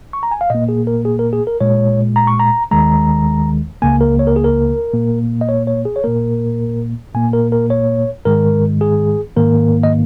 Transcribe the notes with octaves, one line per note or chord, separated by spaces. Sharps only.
C#6
A#5
G#5
F5
A#2 A#3 D#5
G#4
A#4
G#4
A#4
G#4
A#4
A#2 G#3 C#5
A#5
C#6
A#5
D#2 D#3 G#3 A#5
C#2 C#3 A#3 G#5
A#4
C#5
A#4
G#4
A#4
A#2 A#3
D#5
C#5
C#5
G#4
C#5
A#2 A#3 A#4
A#2 A#3 G#5
A#4
A#4
C#5
G#2 D#3 G#3 A#4
G#4
G#2 D#3 A#3 A#4
D#5